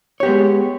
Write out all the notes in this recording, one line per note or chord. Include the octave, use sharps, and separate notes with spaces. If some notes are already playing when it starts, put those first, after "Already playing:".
G#3 B3 G4 C#5